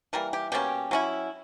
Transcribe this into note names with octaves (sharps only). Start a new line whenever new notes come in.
E3 G3 A#3 A#4
G4
B2 G3 A#3 C#4 G4
F#3 C#4 E4